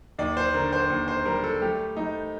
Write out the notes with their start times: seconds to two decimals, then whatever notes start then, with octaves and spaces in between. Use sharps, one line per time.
0.19 D#2 D5
0.37 C5
0.54 D3 A#4
0.73 C5
0.90 D#2
1.08 C5
1.25 G3 A#4
1.44 A4
1.61 A3 G4
1.97 A3 D#4